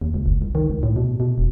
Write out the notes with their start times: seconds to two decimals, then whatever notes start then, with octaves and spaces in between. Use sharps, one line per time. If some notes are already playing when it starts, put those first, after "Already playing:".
0.01 D#2
0.14 C#2
0.26 F#1
0.42 C2
0.55 D#3
0.70 C#2
0.83 A2
0.96 B2
1.20 B2
1.38 E1